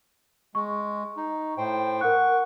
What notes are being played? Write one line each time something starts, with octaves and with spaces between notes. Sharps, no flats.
G#3 C#6
D#4
A2 C5 G5
A#4 F#5 C#6 F#6